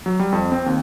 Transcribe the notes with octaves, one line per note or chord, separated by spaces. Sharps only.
F#3
G3
F2
C4
D#2